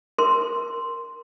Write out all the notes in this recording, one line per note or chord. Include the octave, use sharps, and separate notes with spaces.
A#4 C6